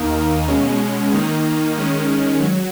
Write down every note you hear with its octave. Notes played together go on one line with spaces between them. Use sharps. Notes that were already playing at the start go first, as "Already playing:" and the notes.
Already playing: D#2 D#3 A#3 D#4
B2 G#3 C#4
D#3 A#3 D#4
D#3 G#3 C#4
F#3